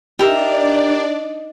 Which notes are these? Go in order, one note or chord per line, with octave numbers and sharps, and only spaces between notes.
D4 D#4 G4 A#4 D5 E5